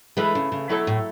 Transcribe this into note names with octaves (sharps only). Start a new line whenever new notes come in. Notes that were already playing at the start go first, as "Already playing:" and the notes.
E3 G#3 A3 E4 B4
C#3
C#3
B2 F#3 A3 E4 A4 C#5
A2